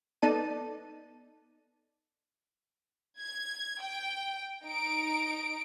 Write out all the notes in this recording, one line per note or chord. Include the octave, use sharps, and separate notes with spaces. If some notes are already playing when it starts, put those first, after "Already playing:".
B3 D#4 A4 D5 A5 D#7
G#6
G5
D#4 D7